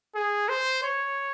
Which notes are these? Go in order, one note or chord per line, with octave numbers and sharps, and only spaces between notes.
G#4
C5
C#5